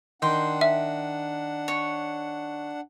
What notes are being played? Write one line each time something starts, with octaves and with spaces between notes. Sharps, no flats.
D#3 D4 F#5 G5 C6
E5
C#5